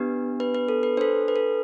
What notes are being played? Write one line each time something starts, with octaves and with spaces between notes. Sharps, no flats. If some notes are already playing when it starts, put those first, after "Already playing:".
Already playing: B3 D4 G4 B4
B4
B4
A4
B4
D4 A4 C5
B4
A4